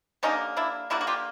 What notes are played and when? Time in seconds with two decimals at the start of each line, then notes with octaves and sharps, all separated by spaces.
0.23 D3 G3 A#3 C#4 D#4
0.57 D4 E4
0.90 D3 G3 A#3 E4 F#4
1.01 F#4
1.07 F4 G4